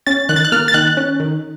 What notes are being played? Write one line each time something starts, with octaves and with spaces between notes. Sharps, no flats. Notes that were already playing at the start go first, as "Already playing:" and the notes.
C#4 A6
D#3 F#6
A6
F#6
A#3 F6
A6
D#3 F#6
C#4
D#3